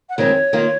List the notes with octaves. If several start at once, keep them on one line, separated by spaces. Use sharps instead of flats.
F#5
F2 D#3 G#3 C4 D#4 C#5
D#3 A#3 F4